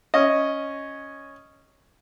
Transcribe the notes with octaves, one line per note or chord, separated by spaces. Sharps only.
C#4 D#5